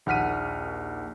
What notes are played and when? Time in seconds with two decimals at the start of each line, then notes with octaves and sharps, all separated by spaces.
0.06 A#1 D#2 F#5 F6 B6 D#7